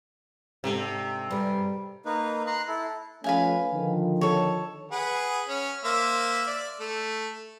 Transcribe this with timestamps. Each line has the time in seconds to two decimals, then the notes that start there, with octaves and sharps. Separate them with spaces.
0.64 G#2 C3 D4 A4
1.31 G2 G3 G#4
2.05 A#3 D#4 B4
2.47 A#5 C6 F#6
2.68 E4 A4
3.24 F3 A3 C#4 B4 F5 G#5
3.72 D3 D#3 F3
4.21 A4 C#5
4.91 G#4 B4 F#5
5.48 C#4
5.84 A#3 C5 E5
6.47 D5
6.80 A3